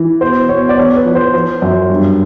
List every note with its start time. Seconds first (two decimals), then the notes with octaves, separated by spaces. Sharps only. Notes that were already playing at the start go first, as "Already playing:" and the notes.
Already playing: E3
0.21 B2 C5
0.49 B2 C#5
0.69 D5
0.78 E2 C#5
0.96 B4
1.06 F3
1.15 C5
1.34 F3 C5
1.62 F#2
1.90 G2